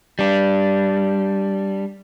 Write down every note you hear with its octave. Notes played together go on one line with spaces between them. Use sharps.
G3 D4